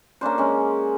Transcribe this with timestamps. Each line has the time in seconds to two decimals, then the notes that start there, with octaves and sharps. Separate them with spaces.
0.21 A#3 C#4 D4 C5
0.38 G#3 C#4